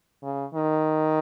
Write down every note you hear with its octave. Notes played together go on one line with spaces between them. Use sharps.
C#3
D#3